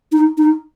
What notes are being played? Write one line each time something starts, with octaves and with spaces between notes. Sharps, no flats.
D#4
D#4